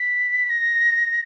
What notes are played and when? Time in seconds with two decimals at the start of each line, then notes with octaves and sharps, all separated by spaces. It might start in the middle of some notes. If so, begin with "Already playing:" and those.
Already playing: B6
0.50 A#6